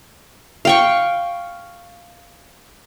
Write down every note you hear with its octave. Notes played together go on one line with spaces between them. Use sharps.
F5 G5 C#6